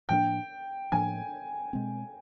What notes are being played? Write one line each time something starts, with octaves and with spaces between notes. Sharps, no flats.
A2 F3 A#3 D4 G5
A2 F3 A#3 D4 G#5
B2 G#3 C4